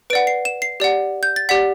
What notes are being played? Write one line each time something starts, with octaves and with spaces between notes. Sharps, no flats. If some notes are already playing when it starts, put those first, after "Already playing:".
B4 D5 F#5 D7
C7
E7
C7
G4 D5 F#5
G6
A6
G4 D5 F#5 B6